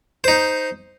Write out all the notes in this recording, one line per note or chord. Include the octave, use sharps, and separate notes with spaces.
D#4 C5